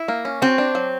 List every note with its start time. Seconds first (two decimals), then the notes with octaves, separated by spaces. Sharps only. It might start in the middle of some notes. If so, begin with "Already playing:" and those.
Already playing: E4
0.08 A#3
0.25 C#4
0.42 C4 F#4
0.58 D4
0.75 F#3